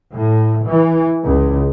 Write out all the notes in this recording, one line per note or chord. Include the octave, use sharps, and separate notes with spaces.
A2
E3
C#2